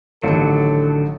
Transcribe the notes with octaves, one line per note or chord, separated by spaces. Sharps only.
A1 D3 D#3 F#3 A4 C#7